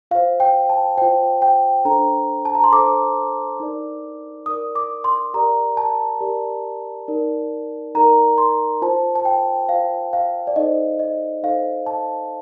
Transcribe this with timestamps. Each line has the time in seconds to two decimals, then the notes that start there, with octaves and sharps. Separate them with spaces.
0.11 F4 C5 F5
0.40 G5
0.69 A5
0.98 F4 C5 G5
1.42 G5
1.85 D4 A4 C5 A#5
2.45 A5
2.55 A#5
2.64 C6
2.72 D4 A4 C5 D6
3.60 D#4 A#4 D5
4.46 D#4 A#4 D5 D#6
4.75 D6
5.04 C6
5.34 G4 A#4 D5 A#5
5.77 A5
6.21 G4 A#4 D5
7.08 D#4 A#4 D5
7.95 D#4 A#4 D5 A#5
8.38 C6
8.82 F4 C5 A5
9.15 A5
9.25 G5
9.68 F4 C5 F5
10.13 F5
10.47 D5
10.56 D#4 A4 C5 D#5
10.99 D#5
11.43 D#4 A4 C5 F5
11.86 A5